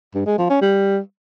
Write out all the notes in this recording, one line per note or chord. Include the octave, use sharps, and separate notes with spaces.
G2
G#3
F3
C#4
G3